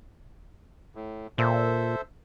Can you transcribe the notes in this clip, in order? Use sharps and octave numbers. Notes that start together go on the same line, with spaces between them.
A2
A#2 A4 C5 E5